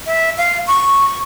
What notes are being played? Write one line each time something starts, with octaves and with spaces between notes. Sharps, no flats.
E5
F5
C#6